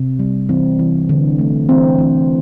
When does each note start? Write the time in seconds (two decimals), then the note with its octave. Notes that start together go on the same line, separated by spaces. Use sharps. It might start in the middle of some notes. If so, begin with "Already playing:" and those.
Already playing: C3
0.19 G3
0.49 E3 C4
0.79 E3
1.09 D3
1.39 A3
1.69 E3 C4
1.99 E3